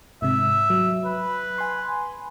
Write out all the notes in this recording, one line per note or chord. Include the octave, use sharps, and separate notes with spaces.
G#2 C3 E5
F#3
B4
G#5 C6